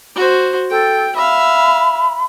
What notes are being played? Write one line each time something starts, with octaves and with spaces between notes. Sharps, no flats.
F#4 C5
A4 G5
E5 F5 B5